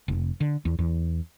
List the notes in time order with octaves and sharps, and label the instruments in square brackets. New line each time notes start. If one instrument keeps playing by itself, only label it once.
[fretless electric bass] F1
D3
E2
E2